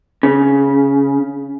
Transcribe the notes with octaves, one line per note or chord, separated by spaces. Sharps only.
C#3